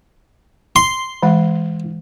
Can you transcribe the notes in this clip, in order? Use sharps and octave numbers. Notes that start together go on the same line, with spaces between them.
C6
E3 G#3 F#5